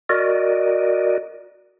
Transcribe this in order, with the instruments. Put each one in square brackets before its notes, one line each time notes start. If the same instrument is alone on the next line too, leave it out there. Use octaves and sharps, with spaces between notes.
[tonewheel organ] F#4 A#4 D5 D#5